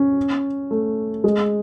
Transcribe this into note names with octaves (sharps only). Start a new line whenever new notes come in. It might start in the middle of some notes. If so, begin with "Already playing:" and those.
Already playing: C#4
A3
G#3